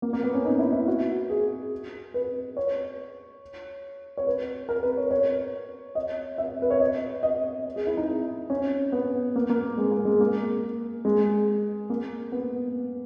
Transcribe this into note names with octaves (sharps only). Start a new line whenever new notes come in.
A#3
A#3
B3
C#4
D#4
E4
E4
F#4
G#4
B4
C#5
C#5
B4
A#4
B4
C#5
C#5
D#5
E5
B4
C#5
D#5
D#5
G#4
E4
D#4
C#4
B3
A#3
A#3
G#3
A#3
G#3
A#3
G#3
A#3
B3